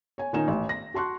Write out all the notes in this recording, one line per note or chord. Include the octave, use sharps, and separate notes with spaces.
C#5 G#5
A#2 D#3 C#4 D#4 G#5 E7
A1
A#6
F#4 A5 C6 C#6 F#6